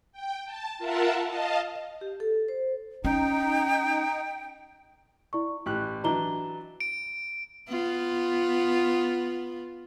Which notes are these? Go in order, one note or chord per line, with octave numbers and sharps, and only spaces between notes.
G5
A5
F4 A#4 E5 F#5 A5
D#5 F5 A5
D#5
G4
A4
C5
C#4 D#4 G5
E4 D5 C#6
A1 G4 C#6 F#6
E3 F#3 D4 D#5 A#5 G7
D7
B3 F4